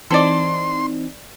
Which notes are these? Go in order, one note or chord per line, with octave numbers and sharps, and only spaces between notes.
E3 C4 D#4 A4 D5 C6